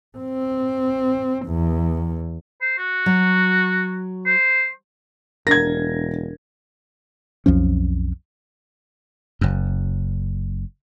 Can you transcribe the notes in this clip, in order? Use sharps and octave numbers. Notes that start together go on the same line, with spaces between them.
C4
E2
C5
F#4
F#3
C5
E1 D4 A#4 G#6 A#6
B1 F2 F3 C#4
F#1 F#2